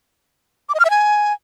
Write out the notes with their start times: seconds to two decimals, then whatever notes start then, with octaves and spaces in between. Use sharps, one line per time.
0.69 D6
0.74 D#5
0.80 F6
0.85 E5
0.90 G#5